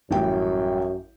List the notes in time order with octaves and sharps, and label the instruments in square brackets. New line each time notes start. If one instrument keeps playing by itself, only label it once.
[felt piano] A1 G3 G5 [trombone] F#2